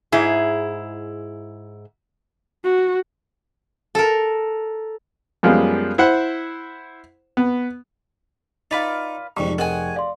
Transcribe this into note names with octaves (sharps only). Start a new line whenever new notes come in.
G#2 E4 G#4
F#4
A4 A#4
F#2 F3 G3 G#3 B3
E4 C5 F#5
B3
D#4 F4 B4 D5
F1 F2 G#2 G3 C#6
C4 G#4 A#4 D#5 F#5 G#5 D#6
D5 F5 C6